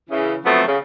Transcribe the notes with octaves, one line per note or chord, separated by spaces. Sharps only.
C#3 E3
F3 F#3 A3 B3 C4
C#3